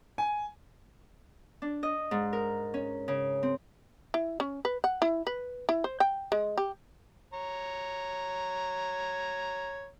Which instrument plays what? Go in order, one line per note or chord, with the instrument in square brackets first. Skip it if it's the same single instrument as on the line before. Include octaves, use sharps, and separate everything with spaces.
[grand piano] G#5
[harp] D4
D#5
G#2
A#4
C#4
C#3
C4
[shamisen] E4
C#4
B4
F#5
E4
B4
E4
C5
G5
G#3
G4
[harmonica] C#5 A#5